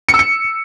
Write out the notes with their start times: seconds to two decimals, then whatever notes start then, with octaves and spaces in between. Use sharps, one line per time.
0.09 C#7
0.14 E6
0.19 C#7